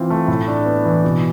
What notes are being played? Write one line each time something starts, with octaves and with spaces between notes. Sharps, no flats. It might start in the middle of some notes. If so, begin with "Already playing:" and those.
Already playing: E3 C4 F4
A3
A2
D4
B3
E3
B2